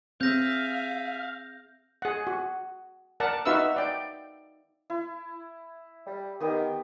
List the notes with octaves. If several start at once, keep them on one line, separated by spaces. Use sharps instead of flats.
C4 G#4 E5 F5 G6 A#6
G#4 F#5
F#4
A#4 D5 F#5 A5
D#4 F#4 B4 E5 F5 E6
D5 G5
E4
G3
D#3 B3 G4 D#6